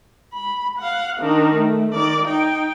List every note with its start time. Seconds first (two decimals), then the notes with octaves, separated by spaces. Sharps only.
0.33 B5
0.79 F5 F#5
1.20 D#3 D4
1.55 A3
1.94 D#3 D5
2.26 D#4 G5